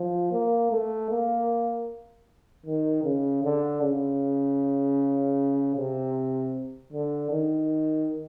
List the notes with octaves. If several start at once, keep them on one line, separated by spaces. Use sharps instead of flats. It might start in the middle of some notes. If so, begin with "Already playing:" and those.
Already playing: F3
A#3
A3
A#3
D#3
C#3
D3
C#3
C3
D3
D#3